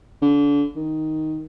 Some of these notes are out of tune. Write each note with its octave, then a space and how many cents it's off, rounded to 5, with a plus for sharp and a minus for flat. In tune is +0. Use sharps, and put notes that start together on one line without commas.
D3 -30
D#3 +5